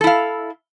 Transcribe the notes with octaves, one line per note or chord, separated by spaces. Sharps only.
E4 A4 F5